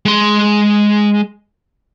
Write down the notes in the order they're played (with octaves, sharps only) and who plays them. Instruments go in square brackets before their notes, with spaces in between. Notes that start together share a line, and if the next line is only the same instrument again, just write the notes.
[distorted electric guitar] G#3 C6